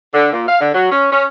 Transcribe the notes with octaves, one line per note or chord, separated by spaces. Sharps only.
D3
A#2
F5
D3
F#3
C#4
C#4